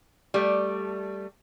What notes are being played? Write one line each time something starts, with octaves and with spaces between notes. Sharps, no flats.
G3 A3